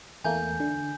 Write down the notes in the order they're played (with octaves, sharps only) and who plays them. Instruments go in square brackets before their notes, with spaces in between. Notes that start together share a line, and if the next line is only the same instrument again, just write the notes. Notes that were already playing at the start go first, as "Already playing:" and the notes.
[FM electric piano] E2 A3 A#3 [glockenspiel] G#5 G6
[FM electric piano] D3